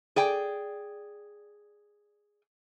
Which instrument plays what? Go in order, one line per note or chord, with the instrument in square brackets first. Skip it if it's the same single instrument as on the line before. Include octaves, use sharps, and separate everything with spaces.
[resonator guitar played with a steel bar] G#4 D5 G5